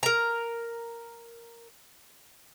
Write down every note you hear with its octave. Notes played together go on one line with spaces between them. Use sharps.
A#4 A#5